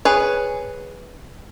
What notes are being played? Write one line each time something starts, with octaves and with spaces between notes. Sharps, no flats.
G#4 B4 C#5